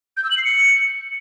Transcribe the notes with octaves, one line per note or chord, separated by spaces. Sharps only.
G6
E6
F#7
C7
C#7